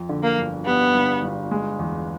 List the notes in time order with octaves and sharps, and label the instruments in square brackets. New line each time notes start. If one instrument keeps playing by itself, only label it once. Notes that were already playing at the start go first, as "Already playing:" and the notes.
Already playing: [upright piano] F2
D3
[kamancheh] A#3
[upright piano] G1
[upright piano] G3 [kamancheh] B3
[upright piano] G1
G1
G#3
E2